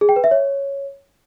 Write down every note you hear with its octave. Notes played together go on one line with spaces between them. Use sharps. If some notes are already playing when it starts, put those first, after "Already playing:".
G#4
G5
B4
E5
C#5